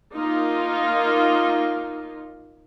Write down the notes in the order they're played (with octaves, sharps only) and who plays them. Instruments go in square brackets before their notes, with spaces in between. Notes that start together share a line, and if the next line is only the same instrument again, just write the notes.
[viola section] A#3 D#4 F4